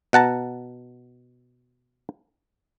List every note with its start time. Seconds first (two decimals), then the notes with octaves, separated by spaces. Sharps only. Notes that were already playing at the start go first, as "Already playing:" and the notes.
0.13 B2 F#5 A5 A#5